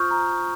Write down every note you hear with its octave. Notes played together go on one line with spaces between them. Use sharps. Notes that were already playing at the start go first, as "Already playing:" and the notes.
Already playing: F4 C5 C#6 D#6 F6 G6
A#5